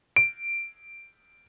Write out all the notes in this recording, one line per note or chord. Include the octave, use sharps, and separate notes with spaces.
D7